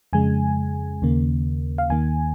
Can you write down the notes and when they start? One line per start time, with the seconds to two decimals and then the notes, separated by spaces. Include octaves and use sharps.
0.13 F2 C#3 G#3 G#5
1.02 D#2 C#3 A#3
1.78 F5
1.90 D#2 D#3 A#3 G#5